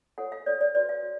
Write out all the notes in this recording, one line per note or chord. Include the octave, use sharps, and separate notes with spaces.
F4 A4 C#5 F#5
F5
F4 A4 C#5 D5
D5
F#4 B4 D5
F5
F#4